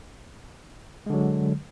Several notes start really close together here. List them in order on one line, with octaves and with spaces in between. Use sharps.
G#3 D3 F#3